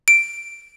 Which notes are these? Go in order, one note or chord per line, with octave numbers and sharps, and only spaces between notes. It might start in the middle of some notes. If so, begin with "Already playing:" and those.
D7